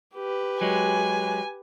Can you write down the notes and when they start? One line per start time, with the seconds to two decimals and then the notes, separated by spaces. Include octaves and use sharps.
0.15 G4 B4
0.61 F#3 G#3 G#5